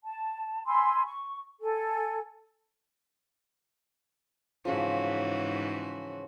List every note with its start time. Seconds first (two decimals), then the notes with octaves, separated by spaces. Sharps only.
0.03 A5
0.67 G#5 B5 C6 E6
1.06 C#6
1.61 A4 G#5
4.65 G#2 C#3 E3 F3 F#4